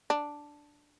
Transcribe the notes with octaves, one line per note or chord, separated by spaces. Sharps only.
D4